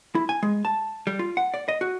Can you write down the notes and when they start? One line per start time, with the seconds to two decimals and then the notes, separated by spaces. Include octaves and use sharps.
0.15 E4
0.29 G#5
0.43 G#3
0.65 A5
1.07 G3
1.19 F4
1.37 F#5
1.54 D5
1.68 D#5
1.81 F#4